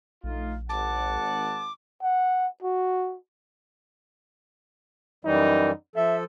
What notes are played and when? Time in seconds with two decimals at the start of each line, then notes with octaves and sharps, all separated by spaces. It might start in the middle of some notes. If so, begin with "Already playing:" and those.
0.23 A#1 A3 D#4 F4
0.70 G#1 F#5 A5 D6
2.03 F#5
2.63 F#4
5.25 F#2 E3 G3 D#4
5.96 F3 A4 E5